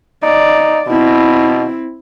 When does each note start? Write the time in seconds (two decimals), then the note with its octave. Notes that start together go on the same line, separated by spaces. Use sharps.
0.23 D#4 D5
0.87 B2 C4 E4